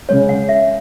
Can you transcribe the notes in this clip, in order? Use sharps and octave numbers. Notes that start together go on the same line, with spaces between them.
C#3 G#3 C#4 C#5
F#5
E5